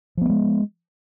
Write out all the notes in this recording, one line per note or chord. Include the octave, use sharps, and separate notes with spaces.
F3 G#3 A3 B3